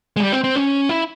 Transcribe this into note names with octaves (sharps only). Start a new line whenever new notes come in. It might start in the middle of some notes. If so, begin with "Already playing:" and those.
G#3
G3
C4
C4
C#4
E4